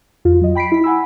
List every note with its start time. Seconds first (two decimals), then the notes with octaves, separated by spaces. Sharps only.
0.25 F2 F4
0.41 F#3 D#5
0.55 G5 B5 B6 C7 D7
0.72 E4 B6
0.84 F#5 G#5 B5 E6